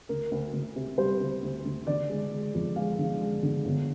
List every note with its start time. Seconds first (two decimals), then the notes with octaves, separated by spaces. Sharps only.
0.09 D2 A#4
0.31 D2
0.53 D2
0.76 C3
0.98 G3 C5
1.21 D2
1.42 D2
1.65 D2
1.87 D3 D5
2.09 G#3
2.32 G#3
2.54 F2
2.76 G#3 F5
2.99 D3
3.21 G#3
3.43 D3
3.65 G1